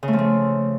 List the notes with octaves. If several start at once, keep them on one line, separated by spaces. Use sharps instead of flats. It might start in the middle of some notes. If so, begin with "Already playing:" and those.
C#3
A3
F3
A3